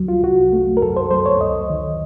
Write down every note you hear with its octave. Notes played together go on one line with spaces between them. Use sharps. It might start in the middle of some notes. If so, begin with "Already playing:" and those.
Already playing: C#2 F#3
F4
C2 F#4
A3
A#4
F#2 A4
C5
F#3 C5
C#5
C#2 D#5
D#3